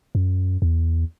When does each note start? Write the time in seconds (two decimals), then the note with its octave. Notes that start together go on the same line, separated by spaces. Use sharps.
0.15 F#2
0.62 E2